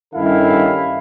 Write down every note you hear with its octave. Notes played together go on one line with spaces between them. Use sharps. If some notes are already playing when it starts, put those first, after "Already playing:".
G2 D#3 C#4 E4 A4 F5